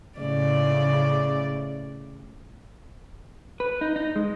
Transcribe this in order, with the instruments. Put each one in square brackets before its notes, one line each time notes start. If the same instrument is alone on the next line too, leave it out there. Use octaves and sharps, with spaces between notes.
[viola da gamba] A2 C#3 D5
[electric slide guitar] B4
D#4
D#4
G#3